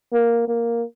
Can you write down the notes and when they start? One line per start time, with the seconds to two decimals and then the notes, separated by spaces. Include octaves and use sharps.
0.13 A#3
0.48 A#3